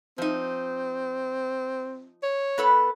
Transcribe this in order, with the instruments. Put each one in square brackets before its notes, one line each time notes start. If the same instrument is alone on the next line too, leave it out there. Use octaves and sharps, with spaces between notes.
[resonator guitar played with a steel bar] F3 D#4 [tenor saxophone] C4
[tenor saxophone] C#5
[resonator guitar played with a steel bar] B3 A4 B4